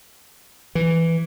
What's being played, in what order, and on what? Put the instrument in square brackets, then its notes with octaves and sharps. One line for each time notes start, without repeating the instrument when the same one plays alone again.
[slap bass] E3